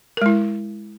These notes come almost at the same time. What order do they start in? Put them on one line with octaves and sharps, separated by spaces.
A#4 G#3 E4